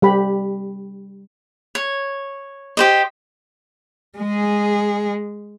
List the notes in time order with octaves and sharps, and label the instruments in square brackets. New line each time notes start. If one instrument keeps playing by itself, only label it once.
[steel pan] G3 G4 B5
[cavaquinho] C#5
G4 C5 D#5
[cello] G#3 G#4